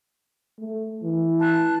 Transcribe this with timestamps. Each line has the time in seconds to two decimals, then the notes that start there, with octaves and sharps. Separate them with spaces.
0.59 A3
1.03 E3
1.40 A5 F#6